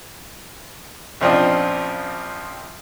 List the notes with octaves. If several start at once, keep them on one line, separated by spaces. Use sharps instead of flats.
A#1 C#3 F3 C4 D4 D#5